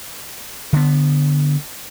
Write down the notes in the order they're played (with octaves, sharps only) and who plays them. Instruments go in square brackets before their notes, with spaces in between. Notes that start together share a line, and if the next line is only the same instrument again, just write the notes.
[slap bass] D3 B3